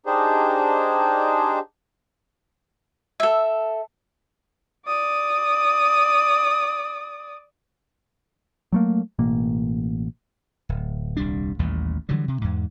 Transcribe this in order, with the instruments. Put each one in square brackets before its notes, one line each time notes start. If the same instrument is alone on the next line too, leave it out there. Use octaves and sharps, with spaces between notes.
[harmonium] D4 D#4 G4 G#4 C5
[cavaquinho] A4 E5
[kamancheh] D5 D#6
[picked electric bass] F#3 A3 A#3
A1 B2 A#3
[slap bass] D1
D#1 C2 G3 D4
A1 D#2 A#2 G3
D3 E3 F#3 G3
C3
E2 G#2